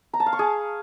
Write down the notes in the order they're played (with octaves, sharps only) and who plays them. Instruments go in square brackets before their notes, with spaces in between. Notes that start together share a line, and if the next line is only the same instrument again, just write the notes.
[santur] A#5
A5
F5
C#6
G#4